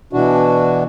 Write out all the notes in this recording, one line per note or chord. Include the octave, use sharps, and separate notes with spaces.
B2 E3 D4 F#4